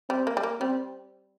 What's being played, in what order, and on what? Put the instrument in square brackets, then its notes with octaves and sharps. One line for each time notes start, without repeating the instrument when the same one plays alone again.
[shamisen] G3 [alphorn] C4
[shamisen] A#3
G3
A#3
[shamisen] G3 [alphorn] C4